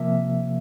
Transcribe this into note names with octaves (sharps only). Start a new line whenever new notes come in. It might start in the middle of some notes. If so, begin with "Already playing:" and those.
Already playing: C3 F3 A#3 E5